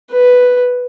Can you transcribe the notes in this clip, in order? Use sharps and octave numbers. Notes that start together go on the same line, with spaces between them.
B4